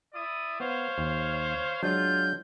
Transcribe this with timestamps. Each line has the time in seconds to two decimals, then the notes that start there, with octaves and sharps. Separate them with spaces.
0.13 E4 D5 D#6
0.60 B3 C5 C#5 F5
0.98 D#2
1.83 F#3 G#3 D4 F4 G6